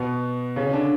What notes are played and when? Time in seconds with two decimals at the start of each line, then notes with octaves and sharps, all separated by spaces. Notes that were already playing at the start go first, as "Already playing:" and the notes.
Already playing: B2 B3
0.56 C#3 C#4
0.67 C#4
0.73 D3 D4